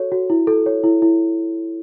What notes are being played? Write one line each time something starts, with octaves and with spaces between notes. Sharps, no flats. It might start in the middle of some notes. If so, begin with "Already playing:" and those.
Already playing: F#4 A4 C#5
F#4
E4
A4
C#5
E4
E4